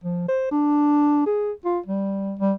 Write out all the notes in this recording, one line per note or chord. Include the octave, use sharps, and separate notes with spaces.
F3
C5
D4
G#4
F4
G3
G3